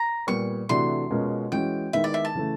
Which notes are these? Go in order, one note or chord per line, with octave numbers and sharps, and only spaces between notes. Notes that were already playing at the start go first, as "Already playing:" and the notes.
Already playing: A#5
A#2 G3 B3 C#6
C3 E3 A3 D4 F#4 C6
B2 G#3 C#4 F4 A#4
E3 G#3 C#4 F#4 G5
D#3 G#3 B3 E4 E5
D5
E5
A5
C#3 E3 A3